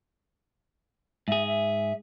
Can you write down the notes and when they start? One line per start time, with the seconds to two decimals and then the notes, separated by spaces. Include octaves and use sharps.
1.28 G#2 G#4 E5
1.47 E5